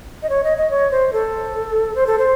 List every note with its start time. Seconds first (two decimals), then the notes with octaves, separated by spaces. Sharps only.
0.23 D#5
0.29 C#5
0.44 D#5
0.58 D#5
0.71 C#5
0.91 C5
1.13 A4
1.95 C5
2.07 A4
2.19 C5